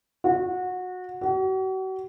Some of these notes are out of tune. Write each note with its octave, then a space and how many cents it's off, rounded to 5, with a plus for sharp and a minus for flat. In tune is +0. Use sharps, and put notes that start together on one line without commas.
F#4 -20
F#4 +40